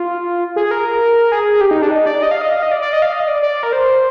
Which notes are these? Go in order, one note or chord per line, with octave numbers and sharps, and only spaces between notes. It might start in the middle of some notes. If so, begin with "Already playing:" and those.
Already playing: F4
G#4
A#4
G#4
G4
D#4
D4
D#4
D5
D#5
F5
D#5
F5
D#5
D5
D5
D#5
F5
D#5
D5
D5
A#4
C5